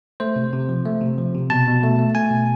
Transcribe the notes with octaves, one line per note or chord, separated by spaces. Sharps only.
A3 C5
C3
C3
F3
A3
C3
F3
C3
B2 A5
B2
A3
A3
A3 G#5
B2